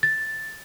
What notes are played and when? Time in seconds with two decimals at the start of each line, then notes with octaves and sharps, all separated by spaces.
0.03 A6